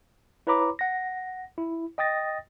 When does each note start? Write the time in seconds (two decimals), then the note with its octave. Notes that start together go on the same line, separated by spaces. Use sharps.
0.47 E4 B4 C#5 A#5 B5 D6
0.79 F#5 A#6
1.58 E4
1.98 D#5 G5 D#6 A6 A#6